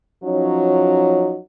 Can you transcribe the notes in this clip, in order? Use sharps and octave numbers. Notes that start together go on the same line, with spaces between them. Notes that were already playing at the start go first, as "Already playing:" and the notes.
F3 F#3 C#4 D#4 F#4 C#5